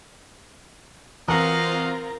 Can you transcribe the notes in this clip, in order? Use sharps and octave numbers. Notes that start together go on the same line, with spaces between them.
E3 C4 F4 F#4 A#4 D#5 F5 A#5